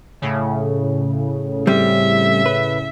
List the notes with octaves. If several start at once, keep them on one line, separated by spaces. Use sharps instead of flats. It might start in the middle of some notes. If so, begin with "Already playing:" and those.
A2 C#3
G3 C4 E5
B4